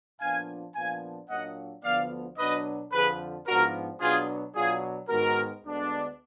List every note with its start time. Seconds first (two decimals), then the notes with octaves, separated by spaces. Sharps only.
0.21 A#2 F3 B3 D4 F5 G#5
0.75 A#2 F3 B3 D4 F5 G#5
1.29 A#2 F#3 A#3 D4 D#5 F#5
1.83 D2 D3 F3 B3 D5 F5
2.38 B2 F#3 B3 D4 B4 D#5
2.92 F2 D3 F3 G#4 B4
3.47 G#2 F3 B3 D4 F#4 A#4
4.01 B2 F#3 B3 D4 F4 G#4
4.55 B2 F#3 D4 F4 G#4
5.09 G#2 D#3 G#3 B3 F#4 A#4
5.64 D2 D3 G#3 B3 D4